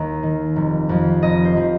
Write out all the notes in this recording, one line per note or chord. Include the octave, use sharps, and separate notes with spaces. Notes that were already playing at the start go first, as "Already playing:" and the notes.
Already playing: D#2 D#5
D#3
F1
F2 F3
F1 D#5
C5
F3